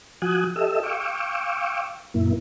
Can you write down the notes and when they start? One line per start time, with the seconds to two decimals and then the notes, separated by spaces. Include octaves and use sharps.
0.22 F3 F#4 G#5 D#6 F#6
0.56 G4 A4 D#5 E5 E6
0.83 F5 G5 C#6 D6 E6
2.14 F#2 A#2 A#3 E4